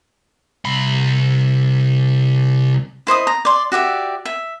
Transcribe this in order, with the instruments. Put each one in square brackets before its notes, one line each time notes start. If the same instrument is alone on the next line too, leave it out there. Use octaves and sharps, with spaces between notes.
[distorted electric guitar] C2 B5
[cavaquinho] E4 C5 D#5 D#6
A#5
D5 C6
F#4 G4 D5 E5
E5